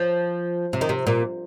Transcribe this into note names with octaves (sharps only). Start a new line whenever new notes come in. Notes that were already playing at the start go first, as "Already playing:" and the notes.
Already playing: F3
C3
D#3
C3
A#2